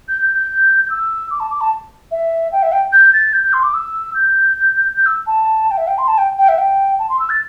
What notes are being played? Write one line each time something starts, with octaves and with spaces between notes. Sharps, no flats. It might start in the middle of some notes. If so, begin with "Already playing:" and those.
G6
G6
G6
G6
E6
D6
A5
D6
A5
E5
G5
E5
G5
G6
A6
G6
G6
C6
D6
E6
G6
G6
E6
A5
G5
E5
G5
C6
A5
G5
G5
E5
G5
A5
C6
E6
A6